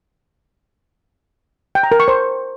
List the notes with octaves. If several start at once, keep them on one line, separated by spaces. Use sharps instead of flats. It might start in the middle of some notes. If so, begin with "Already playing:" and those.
G5
A#5
A#4
C#6
C5